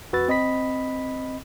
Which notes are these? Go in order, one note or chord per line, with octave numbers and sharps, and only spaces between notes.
F2 F#4 B4 E6 A6
C4 D#5 B5 B6